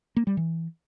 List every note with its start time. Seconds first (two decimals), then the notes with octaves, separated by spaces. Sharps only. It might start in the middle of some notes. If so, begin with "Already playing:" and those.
0.16 A#3
0.27 G3
0.37 E3